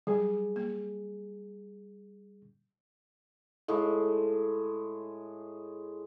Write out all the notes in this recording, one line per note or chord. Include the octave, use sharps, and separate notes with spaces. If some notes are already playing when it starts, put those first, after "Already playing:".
F#3 G3 G#4
A#3
A2 G#3